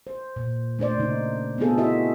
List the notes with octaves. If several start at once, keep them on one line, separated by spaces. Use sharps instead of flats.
C5
A#2
A3 D4 C5 D5
C#3 A#3 D#4
B3 C4 D4 F4 G#4 A4
E4 F#4 A#4 D#5 E5